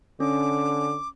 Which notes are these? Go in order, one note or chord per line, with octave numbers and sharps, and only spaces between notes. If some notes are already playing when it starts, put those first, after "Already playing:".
D3 C#4 D6